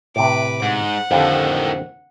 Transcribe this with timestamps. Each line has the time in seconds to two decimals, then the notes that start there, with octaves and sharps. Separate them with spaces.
0.16 A2 C3 B4 D6
0.62 G#2 F#5
1.11 F2 A2 D3 D#3 G4